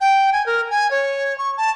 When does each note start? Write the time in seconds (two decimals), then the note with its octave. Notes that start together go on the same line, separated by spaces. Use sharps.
0.01 G5
0.33 G#5
0.46 A#4
0.71 G#5
0.91 C#5
1.38 C#6
1.57 A5